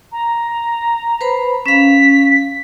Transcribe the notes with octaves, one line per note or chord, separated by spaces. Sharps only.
A#5
B4 C5 B5
C#4 F5 B6